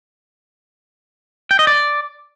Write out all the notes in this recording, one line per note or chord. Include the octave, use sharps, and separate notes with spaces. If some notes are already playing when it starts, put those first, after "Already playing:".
G5
D#5
D5